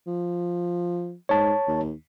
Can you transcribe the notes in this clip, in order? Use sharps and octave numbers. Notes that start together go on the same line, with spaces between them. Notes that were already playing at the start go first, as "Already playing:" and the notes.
F3
G#2 C#5 A5
D#2